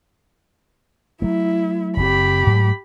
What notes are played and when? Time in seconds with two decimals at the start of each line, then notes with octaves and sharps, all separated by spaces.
1.22 F#3 A3 E4
1.97 F#1 C4 G4 B5
2.47 G#2 F#3 A3